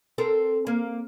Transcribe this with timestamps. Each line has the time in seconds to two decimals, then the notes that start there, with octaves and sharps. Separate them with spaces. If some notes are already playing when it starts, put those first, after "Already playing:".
0.18 C4 A4 A#4
0.67 A#3